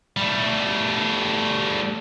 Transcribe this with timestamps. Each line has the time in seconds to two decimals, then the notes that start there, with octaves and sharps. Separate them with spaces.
0.17 G3 A3